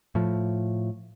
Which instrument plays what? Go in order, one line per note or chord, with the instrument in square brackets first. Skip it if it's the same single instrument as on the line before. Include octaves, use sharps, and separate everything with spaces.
[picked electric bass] A2 F3